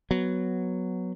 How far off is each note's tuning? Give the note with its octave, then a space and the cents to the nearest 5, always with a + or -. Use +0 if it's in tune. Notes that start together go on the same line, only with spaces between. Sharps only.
F#3 +0 B3 +0